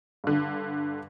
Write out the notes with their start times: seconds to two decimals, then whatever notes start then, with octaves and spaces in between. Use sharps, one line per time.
0.24 G2 D3